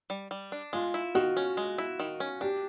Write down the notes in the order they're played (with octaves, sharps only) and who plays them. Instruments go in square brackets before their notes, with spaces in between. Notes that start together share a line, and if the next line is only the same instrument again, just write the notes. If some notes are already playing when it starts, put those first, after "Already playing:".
[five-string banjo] G3
G3
D4
[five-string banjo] G#3 [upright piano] F4
[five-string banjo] E4
[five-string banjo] D#3 [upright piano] F#4
[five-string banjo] C#4
G#3
E4
D#3
C#4
[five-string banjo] D4 [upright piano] G4